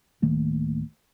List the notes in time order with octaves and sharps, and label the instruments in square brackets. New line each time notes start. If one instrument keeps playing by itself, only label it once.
[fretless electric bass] D1 D#3 A3 A#3